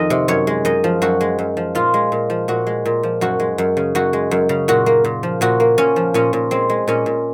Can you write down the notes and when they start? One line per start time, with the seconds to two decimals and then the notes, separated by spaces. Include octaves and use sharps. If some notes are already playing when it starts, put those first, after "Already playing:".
Already playing: F2 D#3 D#5
0.10 C3
0.28 F#2 C#5
0.47 G#3
0.65 F#2 D#5
0.84 F3
1.02 F#2 F#4
1.21 G#3
1.39 F#2
1.57 F3
1.75 A#2 F4
1.94 G#3
2.12 A#2
2.30 F3
2.48 A#2 F#4
2.67 G#3
2.85 A#2
3.03 F3
3.21 F#2 F#4
3.40 G#3
3.58 F#2
3.77 C#3
3.95 F#2 F#4
4.13 G#3
4.31 F#2
4.49 C#3
4.68 A#2 F#4
4.86 A#3
5.05 A#2
5.23 F3
5.41 A#2 F#4
5.60 A#3
5.78 A#2 C#4
5.96 F3
6.14 A#2 C#4
6.33 A#2
6.51 G#3 C4
6.70 G#3
6.88 A#2 C#4
7.06 A#2